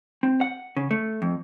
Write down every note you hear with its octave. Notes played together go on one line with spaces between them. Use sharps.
C4
F#5
C#3
A3
F2